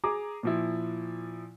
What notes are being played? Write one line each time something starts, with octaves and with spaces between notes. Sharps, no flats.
G#4 A#5 D6
A#2 F3 E4